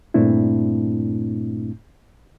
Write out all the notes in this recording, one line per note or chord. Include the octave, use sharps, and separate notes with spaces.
G2 A#2 A3 C4 D4 E4